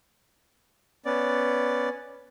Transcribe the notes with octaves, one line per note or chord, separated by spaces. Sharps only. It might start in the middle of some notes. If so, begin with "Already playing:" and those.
B3 C#4 D5